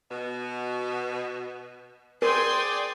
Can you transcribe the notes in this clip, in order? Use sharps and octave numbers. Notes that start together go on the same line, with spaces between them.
B2
G#4 A#4 C5 D5 G5 G#5 C6